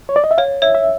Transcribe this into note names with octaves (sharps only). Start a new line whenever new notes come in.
C#5
D5
D#5
E5
C#5 F5
C#5 E5
E5